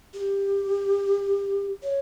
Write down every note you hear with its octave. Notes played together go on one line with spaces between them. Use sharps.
G4
C#5